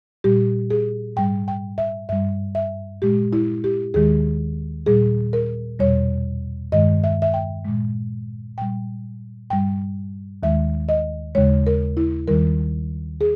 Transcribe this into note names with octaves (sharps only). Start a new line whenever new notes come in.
A#2 G3 G4
G#4
G#2 G3 G5
G5
E5
G2 G3 E5
E5
A#2 G#3 G4
E4
G4
D#2 D#3 G#3 G#4
A#2 G3 G#4
A#4
E2 B2 G3 C#5
G2 D#3 G#3 D#5
E5
E5
G5
A#2 G#3
A#2 G3 G5
G2 G3 G5
D#2 D#3 G#3 E5
D#5
D#2 C#3 G#3 C#5
A#4
E4
D#2 D#3 G3 A#4
G#4